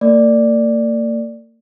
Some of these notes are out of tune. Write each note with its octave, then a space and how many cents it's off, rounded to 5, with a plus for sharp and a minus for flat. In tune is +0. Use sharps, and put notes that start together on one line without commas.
A#3 -40 D5 +0